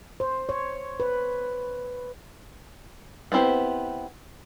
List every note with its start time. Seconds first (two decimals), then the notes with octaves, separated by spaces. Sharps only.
0.20 C5
0.49 C#5
1.00 B4
3.32 B3 C4 E4 G4 C5